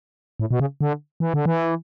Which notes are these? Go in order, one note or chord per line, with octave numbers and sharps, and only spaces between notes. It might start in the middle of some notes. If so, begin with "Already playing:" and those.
A2
B2
C#3
D3
E3
D3
E3